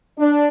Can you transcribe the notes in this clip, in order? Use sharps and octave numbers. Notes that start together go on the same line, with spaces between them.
D4